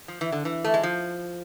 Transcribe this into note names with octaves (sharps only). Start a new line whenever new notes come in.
F3
E3
D3
E3
A3
G#3
F3